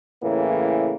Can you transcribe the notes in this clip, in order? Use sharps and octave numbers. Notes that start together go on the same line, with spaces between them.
A2 C#3 E3 A#3